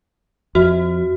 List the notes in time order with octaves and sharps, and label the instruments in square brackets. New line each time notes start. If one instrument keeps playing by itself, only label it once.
[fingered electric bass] F2 [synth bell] F#4